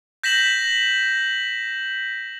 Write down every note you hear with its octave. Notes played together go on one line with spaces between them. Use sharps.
G6 A#6 B6 E7 F#7